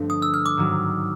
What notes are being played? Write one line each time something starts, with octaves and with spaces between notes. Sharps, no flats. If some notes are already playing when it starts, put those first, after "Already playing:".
Already playing: G2 D3 F3 A3 C4
D#6
E6
F6
D6
G#2 D#3 F#3